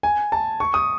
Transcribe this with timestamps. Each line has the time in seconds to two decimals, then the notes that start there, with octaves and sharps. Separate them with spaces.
0.03 G#5
0.32 A5
0.60 C#6
0.74 D#6